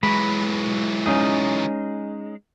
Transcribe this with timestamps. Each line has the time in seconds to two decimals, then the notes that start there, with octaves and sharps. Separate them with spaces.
0.03 E3 F#3 G#3 B5
1.06 C#4 D#4 G#4